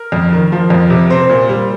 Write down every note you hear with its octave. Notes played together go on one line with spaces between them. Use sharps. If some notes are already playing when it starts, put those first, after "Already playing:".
Already playing: A#4
F2
D#3
F3
F2
C3
C4 C5
A#2
G3